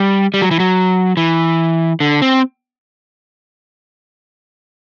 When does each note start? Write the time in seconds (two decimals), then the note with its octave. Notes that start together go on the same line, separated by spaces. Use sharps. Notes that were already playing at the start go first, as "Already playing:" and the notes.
Already playing: G3
0.34 G3
0.42 F#3
0.51 E3
0.60 F#3
1.17 E3
2.00 D3
2.22 C4